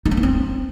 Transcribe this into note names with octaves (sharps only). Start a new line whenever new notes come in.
D#4
C4
B3
C4